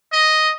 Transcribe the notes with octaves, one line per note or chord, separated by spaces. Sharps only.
D#5